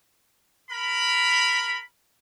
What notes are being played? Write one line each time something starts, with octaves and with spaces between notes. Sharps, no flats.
A#4 B5